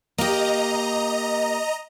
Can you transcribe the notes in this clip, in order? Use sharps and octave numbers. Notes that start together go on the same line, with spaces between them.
A#3 G4 D#5 A#5